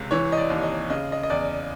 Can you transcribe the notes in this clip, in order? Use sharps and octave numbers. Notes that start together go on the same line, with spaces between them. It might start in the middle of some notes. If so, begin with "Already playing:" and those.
Already playing: C#2 C3
E3 C#5
D#5
D5
D#2
D#5
C#3 D#5
D#5
D#5
E2 D5